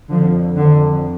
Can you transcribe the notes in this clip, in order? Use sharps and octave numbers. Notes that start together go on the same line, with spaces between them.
F2 D3 F3
D3